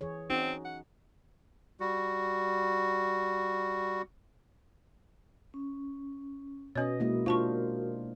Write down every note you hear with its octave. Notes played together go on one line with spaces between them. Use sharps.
E3 G#4 C#5
C4 C#4 D#4 F#4
F#5
G3 F#4
C#4
B2 C#4 F#4 B4 C#5 D#5
G#3 A#3 E4 F#4 A#4
D4 F4 C5 F5 A5 C#6